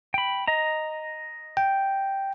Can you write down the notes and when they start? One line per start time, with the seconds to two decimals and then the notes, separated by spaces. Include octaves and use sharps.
0.14 G5 B5
0.47 D#5 A#5
1.57 G5